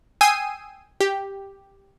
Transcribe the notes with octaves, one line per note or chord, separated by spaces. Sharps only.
G5 G#5 D#6 E6 C7 D#7
G4